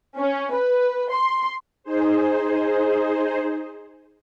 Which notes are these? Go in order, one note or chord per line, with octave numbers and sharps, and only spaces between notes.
C#4
B4
C6
D#4 G#4 C5